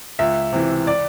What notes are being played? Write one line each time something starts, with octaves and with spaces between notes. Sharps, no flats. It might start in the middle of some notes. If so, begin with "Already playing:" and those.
C#2 E5
C3 E3
D5